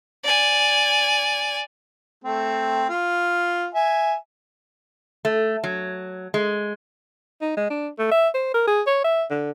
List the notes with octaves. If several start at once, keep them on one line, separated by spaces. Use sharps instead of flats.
D5 G#5
A3 C4
F4
E5 G#5
A3
F#3
G#3
D#4
G#3
D4
A3
E5
C5
A#4
G#4
C#5
E5
D3